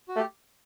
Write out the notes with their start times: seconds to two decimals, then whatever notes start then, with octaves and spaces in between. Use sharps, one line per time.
0.09 F#4
0.16 A3 G4